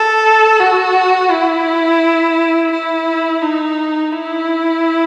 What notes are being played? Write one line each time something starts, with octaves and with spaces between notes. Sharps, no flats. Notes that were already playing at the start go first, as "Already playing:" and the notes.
Already playing: A4
F#4
E4
E4
D#4
E4